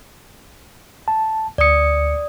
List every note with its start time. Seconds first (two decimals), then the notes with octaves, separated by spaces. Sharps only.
1.08 A5
1.58 D2 D5 D#6 C#7